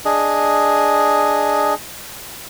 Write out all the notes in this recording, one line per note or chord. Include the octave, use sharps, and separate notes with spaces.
D4 G#4 D#5